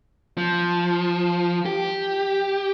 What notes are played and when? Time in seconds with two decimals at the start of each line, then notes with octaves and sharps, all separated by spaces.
0.38 F3
1.66 G4